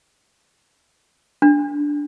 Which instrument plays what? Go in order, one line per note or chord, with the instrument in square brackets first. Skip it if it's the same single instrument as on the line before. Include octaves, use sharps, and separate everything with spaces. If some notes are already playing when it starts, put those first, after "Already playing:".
[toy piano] D4